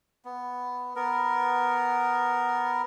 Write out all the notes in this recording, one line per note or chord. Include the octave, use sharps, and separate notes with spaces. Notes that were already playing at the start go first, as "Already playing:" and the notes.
B3
B3 A#4